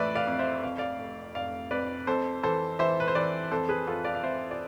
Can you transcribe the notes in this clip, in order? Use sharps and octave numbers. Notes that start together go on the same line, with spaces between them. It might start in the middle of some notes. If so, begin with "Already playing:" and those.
Already playing: F2 E3 A3 B4 D5 E5
D5 F5
F2
C5 E5
F2 F5
D5 F5
F1
F1 D5 F5
F2 B4 D5
F2 A4 C5
E3 A4 C5
E3 C5 E5
B4
C5
E3 B4 D5
F2 A4 C5
G#4 B4
F2 F4 A4
D5 F5
F5
F2 C5 E5
D5